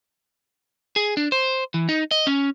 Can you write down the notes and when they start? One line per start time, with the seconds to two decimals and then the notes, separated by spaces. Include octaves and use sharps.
0.96 G#4
1.17 D4
1.32 C5
1.74 E3
1.89 D#4
2.11 D#5
2.27 C#4